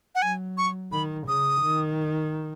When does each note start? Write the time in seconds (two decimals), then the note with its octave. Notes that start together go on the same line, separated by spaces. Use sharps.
0.15 F#5
0.22 F#3 G#5
0.58 C#6
0.92 D#3 B5
1.28 C#3 D#6
1.62 D#3